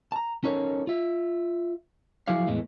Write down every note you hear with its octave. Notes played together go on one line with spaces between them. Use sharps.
A5 A#5
C#4 D#4 A4 A#4 C5 C#5
F4 E5
F3 F#3 E4 G#4 D5 F5
E2 A2 E3 G#3